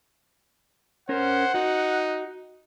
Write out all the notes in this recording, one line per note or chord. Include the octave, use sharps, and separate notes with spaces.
C#4 A#4 C5 F#5
D#4 F#4